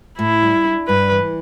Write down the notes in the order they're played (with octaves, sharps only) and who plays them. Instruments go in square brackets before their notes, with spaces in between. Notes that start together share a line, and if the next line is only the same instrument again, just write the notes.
[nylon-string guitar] A2 [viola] E4
[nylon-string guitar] G3
D4
[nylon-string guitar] G2 [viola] B4
[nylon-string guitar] E3